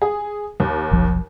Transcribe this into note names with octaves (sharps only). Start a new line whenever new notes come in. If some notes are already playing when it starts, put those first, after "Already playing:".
G#4
D#2
F1 B1 F3